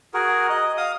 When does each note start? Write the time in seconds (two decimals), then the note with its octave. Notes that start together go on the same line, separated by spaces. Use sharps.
0.14 F#4 G#4 A#4
0.50 D#5
0.77 F5 D#6